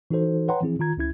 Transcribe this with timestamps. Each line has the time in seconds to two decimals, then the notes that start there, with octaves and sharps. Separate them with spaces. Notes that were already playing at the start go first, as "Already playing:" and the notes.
0.11 E3 D#4 F#4 A4 C5
0.48 B4 C#5 F#5 G5 A#5 C6
0.61 E3 F3 C4 E4 G#4
0.79 D#3 F4 A#5 G#6
0.97 C#2 C#4 E4 G#6